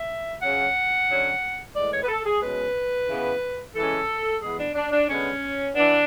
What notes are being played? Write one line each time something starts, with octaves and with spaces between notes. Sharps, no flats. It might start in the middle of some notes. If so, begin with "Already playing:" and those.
Already playing: E5
C#3 F#3 C#4 F#5
D3 F#3 C#4
A2 E3 G#3 D5
C#5
B4
A4
G#4
B2 G#3 C#4 B4
C#3 E3 B3
E3 G#3 C#4 A4
E3 G#3 B3 G#4
D4
D4
D4
D3 G#3 B3 C#4
E3 B3 D4